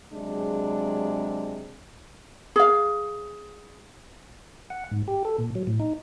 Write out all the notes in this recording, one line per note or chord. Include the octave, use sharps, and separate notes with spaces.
C3 F#3 G#3 D4 G#4
G#4 F5
F#5
G#2
G4
A4
A#2
F#3
A2
D#4